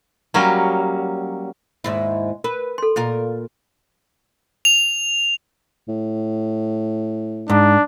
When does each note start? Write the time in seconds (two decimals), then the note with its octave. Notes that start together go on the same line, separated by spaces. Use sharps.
0.34 F#3 G3 A#3 C#4
1.84 D#2 G#2 E4
2.44 A#4 B4
2.78 A4 C6
2.96 A#2 F4 A#4
4.65 F7
5.88 A2
7.50 G#2 D4